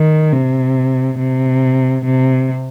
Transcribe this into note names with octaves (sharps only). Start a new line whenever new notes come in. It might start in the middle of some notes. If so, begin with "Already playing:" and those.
Already playing: D#3
C3
C3
C3